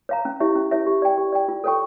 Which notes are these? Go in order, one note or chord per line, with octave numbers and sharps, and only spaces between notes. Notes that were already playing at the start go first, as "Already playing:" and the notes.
C#5 F5 A#5
C#4
E4 G4 C#5 E5
C#4
E4 G4 C#5 E5
G4
D5 G5
G4
D5 G5
F4
A4 C#5 G5 C#6